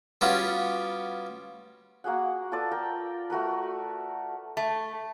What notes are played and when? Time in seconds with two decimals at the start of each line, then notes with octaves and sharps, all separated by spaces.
0.21 G3 B3 C#4 F4 F#4
2.04 A#3 F#4 G#4 F#5
2.52 F4 A4 B4 D5
2.72 A#4 G5
3.30 A3 F#4 A#4 B4
4.57 A3